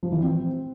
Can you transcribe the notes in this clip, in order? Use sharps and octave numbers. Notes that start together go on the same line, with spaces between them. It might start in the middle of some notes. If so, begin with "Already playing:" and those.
F3
E3
C4